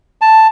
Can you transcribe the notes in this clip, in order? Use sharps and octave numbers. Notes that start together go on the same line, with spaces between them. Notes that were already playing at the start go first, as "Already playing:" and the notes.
A5